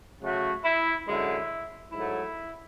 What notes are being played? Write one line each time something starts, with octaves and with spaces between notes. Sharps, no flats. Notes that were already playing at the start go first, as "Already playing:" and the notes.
C#3 F#3 A3 F#4
E4
F#2 D3 G#3 E4
G#2 F#3 A3 E4